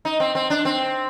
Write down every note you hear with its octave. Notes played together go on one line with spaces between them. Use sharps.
D#4
C4
C4
D4
C4